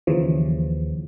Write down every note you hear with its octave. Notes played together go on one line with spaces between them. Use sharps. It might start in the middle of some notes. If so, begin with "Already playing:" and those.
D#2 C#3 E3 F3